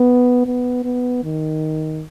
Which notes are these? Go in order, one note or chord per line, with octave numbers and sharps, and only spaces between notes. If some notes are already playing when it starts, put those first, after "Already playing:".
Already playing: B3
B3
B3
D#3